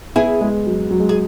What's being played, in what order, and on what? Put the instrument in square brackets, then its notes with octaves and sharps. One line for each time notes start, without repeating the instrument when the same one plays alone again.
[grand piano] B3 [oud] E4 G#4
[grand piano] G#3
F#3
F#3
G#3
[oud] G#4